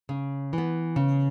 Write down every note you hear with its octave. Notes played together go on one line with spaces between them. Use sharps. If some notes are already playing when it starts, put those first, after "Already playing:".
C#3
E3 B3
C#3